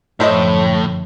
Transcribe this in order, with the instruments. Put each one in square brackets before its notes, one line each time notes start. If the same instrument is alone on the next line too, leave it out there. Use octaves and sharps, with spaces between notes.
[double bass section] F#2 D3 F3 [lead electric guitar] A2 [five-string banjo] E4 C5 D#5 [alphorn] C#5